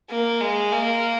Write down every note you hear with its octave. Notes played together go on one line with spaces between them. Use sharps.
A#3
G#3
A#3